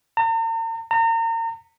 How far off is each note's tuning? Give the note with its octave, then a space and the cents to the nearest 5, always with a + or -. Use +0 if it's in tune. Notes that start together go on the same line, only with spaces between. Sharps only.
A#5 -45
A#5 -35